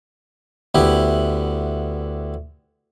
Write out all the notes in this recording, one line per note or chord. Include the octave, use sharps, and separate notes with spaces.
D2 B3 E4 G4